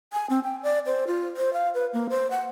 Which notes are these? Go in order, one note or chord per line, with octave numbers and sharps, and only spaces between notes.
G#5
C4
G5
D5
C5
F4
C5
F5
B4
A#3
C5
F#5